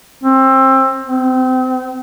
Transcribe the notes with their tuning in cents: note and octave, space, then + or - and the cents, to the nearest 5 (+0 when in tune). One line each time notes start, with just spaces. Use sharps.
C4 +25
C4 -30